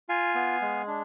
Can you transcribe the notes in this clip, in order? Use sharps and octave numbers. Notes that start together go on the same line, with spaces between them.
F4 F5 G#5
B3
G#3
D4